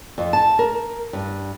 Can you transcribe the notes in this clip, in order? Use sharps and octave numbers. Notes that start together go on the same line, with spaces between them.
F2
A5
A#4
G2